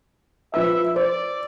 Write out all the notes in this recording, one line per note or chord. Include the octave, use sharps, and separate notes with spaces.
F3 B4 E5 E6
C5 D5